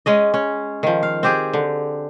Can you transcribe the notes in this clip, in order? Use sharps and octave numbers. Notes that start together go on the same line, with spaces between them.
G#3 C#4 D#5
C#4
D#3 F3
F5
C4 G4 G#4
D3